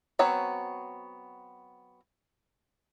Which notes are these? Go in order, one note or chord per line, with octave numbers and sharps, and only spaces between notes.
F#3 B3 C4 C#5